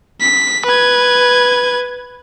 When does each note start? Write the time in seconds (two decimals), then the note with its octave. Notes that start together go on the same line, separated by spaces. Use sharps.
0.20 B6
0.66 B4 G#6